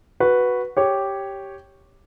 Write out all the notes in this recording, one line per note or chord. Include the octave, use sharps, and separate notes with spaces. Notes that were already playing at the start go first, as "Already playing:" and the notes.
F#4 B4
G4 C#5